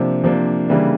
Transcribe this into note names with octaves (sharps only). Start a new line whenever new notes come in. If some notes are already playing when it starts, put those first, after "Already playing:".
Already playing: C3 F3 A#3 D4
C3 F3 A#3 D4
C#3 E3 G3 A#3 D4